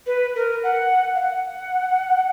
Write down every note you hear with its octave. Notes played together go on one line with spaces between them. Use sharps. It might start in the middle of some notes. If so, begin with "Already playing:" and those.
B4
A#4
F#5
F5
F#5